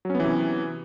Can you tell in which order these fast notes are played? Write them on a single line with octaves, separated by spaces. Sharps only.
F#3 C#4 B3 E3 C3